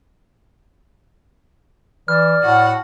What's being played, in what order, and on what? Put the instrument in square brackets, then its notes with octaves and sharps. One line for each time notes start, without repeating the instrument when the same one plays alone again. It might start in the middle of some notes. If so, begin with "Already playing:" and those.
[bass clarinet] E3 [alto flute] D5 [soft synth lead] F6
[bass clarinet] A2 [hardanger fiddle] F#4 F#5